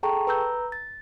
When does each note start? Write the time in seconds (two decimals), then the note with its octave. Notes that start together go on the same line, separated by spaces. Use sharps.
0.03 G#4 A4 G5 A5 A#5 C#6
0.27 B4 A#5 E6 G6
0.72 A6